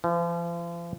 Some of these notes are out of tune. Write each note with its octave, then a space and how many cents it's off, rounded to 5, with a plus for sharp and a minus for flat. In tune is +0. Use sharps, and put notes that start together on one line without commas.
F3 -40